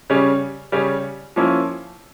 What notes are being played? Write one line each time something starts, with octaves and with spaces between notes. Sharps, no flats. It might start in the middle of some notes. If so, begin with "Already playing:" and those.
C#3 G3 C#4
C#3 G3 C#4
F3 A#3 C#4 E4